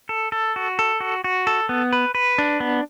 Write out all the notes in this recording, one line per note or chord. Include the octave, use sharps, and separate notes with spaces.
A4
A4
F#4
A4
F#4
F#4
A4
B3
B4
B4
D4
B3